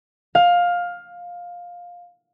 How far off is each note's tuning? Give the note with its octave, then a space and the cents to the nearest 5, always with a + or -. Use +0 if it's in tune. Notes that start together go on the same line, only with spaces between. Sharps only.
F5 +15